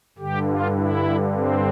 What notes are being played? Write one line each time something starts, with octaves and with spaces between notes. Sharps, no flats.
G2 D3 G4
F4
E4
C4